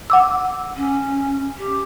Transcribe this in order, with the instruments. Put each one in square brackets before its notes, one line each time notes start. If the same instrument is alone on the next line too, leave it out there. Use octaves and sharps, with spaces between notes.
[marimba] F#5 D6 E6
[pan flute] C#4
G4